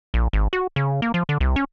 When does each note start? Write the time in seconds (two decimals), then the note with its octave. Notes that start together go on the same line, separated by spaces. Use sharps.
0.14 A#1
0.33 G#1
0.53 F#4
0.76 C#3
1.02 A#3
1.14 F3
1.29 D3
1.41 C2
1.56 C#4